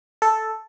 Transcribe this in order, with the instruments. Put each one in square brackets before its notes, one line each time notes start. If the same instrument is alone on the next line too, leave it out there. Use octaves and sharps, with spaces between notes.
[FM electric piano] A4